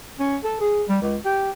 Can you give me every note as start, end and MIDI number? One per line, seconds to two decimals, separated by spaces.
0.19 0.36 61
0.43 0.58 69
0.60 0.83 68
0.88 0.97 55
1.01 1.16 37
1.25 1.50 67